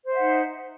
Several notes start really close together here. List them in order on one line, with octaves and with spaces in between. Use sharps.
C5 E5 F#5 D#4